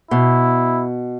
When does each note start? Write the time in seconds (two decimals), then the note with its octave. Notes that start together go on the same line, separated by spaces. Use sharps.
0.11 B2 E4